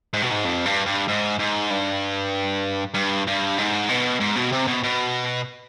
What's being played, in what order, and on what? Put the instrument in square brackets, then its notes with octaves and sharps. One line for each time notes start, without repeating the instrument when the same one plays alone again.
[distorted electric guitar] G#2
B2
G#2
F2
G2
G2
G#2
G#2
G2
G2
G2
G#2
B2
G#2
B2
C3
B2
B2